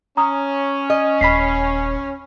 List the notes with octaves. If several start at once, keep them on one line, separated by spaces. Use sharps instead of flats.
C#4 A#5 D#6
D#5
D#1 B5 B6 C7